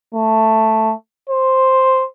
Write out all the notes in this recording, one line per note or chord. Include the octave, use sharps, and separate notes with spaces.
A3
C5